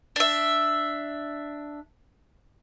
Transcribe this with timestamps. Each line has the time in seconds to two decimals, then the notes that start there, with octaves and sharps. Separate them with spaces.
0.16 D4 E5